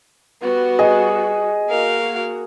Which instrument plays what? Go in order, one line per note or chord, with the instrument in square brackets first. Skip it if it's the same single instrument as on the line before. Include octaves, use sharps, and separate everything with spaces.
[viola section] G3 F#4 [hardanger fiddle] B3
[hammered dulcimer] G#4 [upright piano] D#5
[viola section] A#3 F#4 [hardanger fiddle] A#4 F5